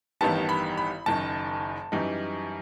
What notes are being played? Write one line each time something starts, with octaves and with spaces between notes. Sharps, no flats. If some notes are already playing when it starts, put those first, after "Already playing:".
A1 G2 D#3 G3 B3 A5
B5
B5
F#1 F#2 D#3 A5
F#2 E3 G3 D#4